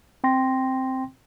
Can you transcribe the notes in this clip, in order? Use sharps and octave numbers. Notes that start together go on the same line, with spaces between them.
C4 G5 C6 A#6